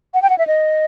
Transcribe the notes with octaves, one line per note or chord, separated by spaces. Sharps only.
F#5
G5
F#5
E5
D#5